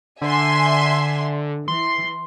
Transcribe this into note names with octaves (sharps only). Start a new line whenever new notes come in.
D3 E5 G#5 C6
E3 C6